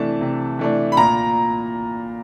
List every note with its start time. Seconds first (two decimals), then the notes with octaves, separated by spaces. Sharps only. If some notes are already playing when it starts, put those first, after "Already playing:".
Already playing: C3 E3 A3 D4 A5
0.21 C3
0.59 E3 A3 D4
0.92 B5
0.97 A#2 A#5